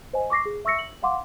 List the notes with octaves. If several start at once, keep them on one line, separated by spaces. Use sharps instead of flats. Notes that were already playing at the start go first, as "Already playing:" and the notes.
C5 D#5 G#5
C#6 D6 A#6 C7
G#4
E5 C#6 E6 A#6 C#7
F#7
F5 F#5 C6 D6